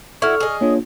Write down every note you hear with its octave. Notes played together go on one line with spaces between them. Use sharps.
E4 F#4 A4 C#6 F6
G#4 D#5
A#3 D4 F4 C#5